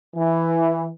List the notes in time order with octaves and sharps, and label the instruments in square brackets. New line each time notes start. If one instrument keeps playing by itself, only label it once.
[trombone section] E3